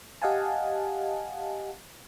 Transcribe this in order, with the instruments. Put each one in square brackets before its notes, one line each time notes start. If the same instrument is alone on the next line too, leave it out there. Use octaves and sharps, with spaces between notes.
[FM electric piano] G4 D#5 F5 F#5 G#5 A5